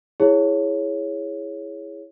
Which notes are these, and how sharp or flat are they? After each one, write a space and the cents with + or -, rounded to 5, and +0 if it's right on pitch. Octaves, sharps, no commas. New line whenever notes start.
E4 +0 G#4 +0 C#5 +0